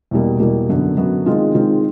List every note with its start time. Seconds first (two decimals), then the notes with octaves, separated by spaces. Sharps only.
0.11 E2 B2 G3 A#3
0.40 E2 B2 G3 A#3
0.69 F#2 D3 F#3 B3
0.97 F#2 D3 F#3 B3
1.26 D#3 G#3 C4 F4
1.55 D#3 G#3 C4 F4